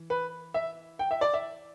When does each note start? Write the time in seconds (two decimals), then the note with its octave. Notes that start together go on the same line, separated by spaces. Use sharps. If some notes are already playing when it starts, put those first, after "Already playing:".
Already playing: E3
0.10 B4
0.54 E5
0.99 G5
1.11 E5
1.21 D5
1.34 E5